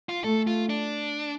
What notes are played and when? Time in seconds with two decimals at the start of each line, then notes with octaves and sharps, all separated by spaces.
0.09 F4
0.24 A3 A4
0.47 F4
0.69 D4